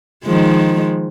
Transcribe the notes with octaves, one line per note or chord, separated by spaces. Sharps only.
D#3 F3 G#3